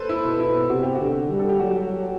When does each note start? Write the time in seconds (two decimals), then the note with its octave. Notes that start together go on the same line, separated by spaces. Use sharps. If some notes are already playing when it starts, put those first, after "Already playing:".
Already playing: A4 B4 C5
0.09 E4
0.25 B2
0.40 E4
0.70 C3 F#4
0.83 G4
0.95 F#4
1.00 D3
1.30 G3
1.39 A4
1.49 G4
1.60 F#3 F#4